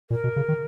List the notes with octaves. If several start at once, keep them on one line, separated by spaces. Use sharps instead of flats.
A#2 A#4
B2
C#3
D#3